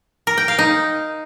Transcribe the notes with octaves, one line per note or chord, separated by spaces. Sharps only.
A#4
G5
F5
D#4